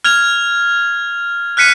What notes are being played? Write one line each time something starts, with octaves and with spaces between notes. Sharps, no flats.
F6 G#6 F7
F6 F#6 B6 C#7 D#7